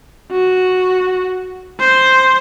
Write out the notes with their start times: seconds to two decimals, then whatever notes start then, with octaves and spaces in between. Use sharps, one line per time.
0.32 F#4
1.80 C5